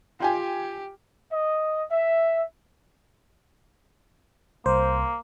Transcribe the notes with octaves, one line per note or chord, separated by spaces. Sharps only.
F4 G4 G5 G#5
D#5
E5
C2 A#3 C5